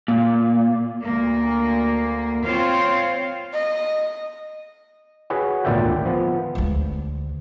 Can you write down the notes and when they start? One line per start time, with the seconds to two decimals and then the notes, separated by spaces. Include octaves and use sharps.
0.08 A#2
1.01 D2 A#3
2.45 C4 F4 C5 C#5 F5
3.54 D#5
5.30 F#4 G#4 B4 C#5 F#5
5.65 G#1 D2 A#2 D5 E5 G5
6.05 F3 B3
6.55 D2 G#3